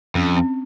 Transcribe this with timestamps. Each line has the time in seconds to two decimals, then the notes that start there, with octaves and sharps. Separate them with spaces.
0.15 F2 C#4
0.36 C4